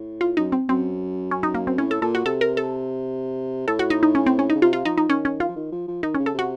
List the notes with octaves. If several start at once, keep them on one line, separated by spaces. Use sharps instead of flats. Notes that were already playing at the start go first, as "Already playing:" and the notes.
Already playing: A2
F4
F#2 D#4
C4
F#2 C4
C#4
D#4
A#3
C4
A2 C#4
A4
A#2 A4
F#4
C3 A4
A#4
A4
A2 A4
F#4
D#4
D#4
C#4
C4
C#4
D#4
C#3
C3 F4
F4
F3 D#4
D#4
D#3 C#4
C#4
F4
F3
D#3
F3
F3
D#3 D#4
C#4
C#3
A4
C3 F#4